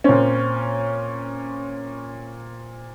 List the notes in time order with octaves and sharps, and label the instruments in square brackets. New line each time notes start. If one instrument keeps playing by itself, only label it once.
[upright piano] A#2 C4 [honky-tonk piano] C#4